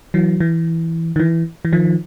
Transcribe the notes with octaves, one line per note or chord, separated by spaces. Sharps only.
E3 F#3
E3
D#3
E3
E3
D#3 F3